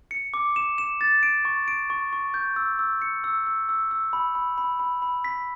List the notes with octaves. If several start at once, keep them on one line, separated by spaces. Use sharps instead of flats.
C#7
D6
E7
E7
A6
D7
C#6
D7
C#6
C#6
G6
E6
E6
C#7
E6
E6
E6
E6
B5
B5
B5
B5
B5
B6